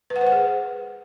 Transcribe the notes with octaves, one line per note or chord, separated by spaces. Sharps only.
B4
F#5
C5
F#5
G#4